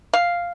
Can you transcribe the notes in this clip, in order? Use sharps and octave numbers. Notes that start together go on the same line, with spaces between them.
F5